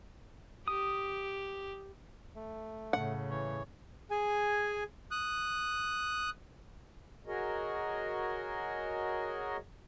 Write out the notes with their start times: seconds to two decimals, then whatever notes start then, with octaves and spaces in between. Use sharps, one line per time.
0.68 G4 D#6
2.36 A3
2.93 A2 C#3 F#5
3.31 E3 C#5
4.11 G#4 G#5
5.11 D#6 F#6
7.27 F#4 G#4 A#4 C#5 D#5